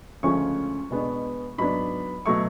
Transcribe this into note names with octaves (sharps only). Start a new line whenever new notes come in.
D2 C#3 F3 G#3 C#4 C#6
B2 G#3 B3 D4
G#2 F#3 B3 D4 B5
B2 F#3 A3 C#6